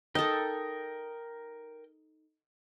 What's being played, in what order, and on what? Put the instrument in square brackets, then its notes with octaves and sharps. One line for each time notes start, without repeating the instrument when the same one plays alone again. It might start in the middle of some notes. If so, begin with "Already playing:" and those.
[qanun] D#4 A4 [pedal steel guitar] A#4 G5